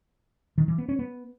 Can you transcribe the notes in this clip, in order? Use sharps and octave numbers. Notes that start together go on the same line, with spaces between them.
D#3
E3
B3
C#4
B3